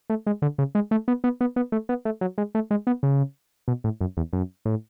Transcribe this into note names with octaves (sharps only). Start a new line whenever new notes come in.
A3
G#3
D3
C#3
G#3
A3
B3
B3
B3
B3
A3
B3
A3
F#3
G#3
A3
G#3
B3
C#3
B2
A2
F#2
E2
F#2
A2